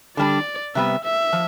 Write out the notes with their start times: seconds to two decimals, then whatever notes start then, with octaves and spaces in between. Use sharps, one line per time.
0.17 D3 G3 D4 D5
0.75 C3 G3 B3 E5
1.04 E5
1.33 F3